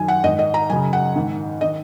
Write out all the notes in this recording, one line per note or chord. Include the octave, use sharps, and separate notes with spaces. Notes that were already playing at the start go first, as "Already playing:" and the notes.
Already playing: F#2 D#3 G#5
F#5
G#2 D#3 D#5
D#5
A#5
F#2 C#3 G#5
F#5
G#2 D#3
D#3 D#5